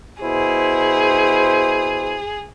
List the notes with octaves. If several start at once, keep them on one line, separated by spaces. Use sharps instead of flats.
B2 E4 G#4 C5